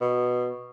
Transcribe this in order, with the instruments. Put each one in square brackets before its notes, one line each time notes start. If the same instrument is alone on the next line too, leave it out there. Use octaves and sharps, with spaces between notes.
[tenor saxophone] B2